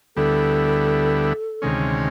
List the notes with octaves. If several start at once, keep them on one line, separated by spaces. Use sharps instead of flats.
D2 D3 G3 B3 E4 A4
D2 C3 D#3 G#3 C#4